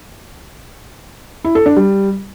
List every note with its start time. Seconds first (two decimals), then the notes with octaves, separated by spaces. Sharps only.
1.44 E4
1.55 A4
1.66 D4
1.76 G3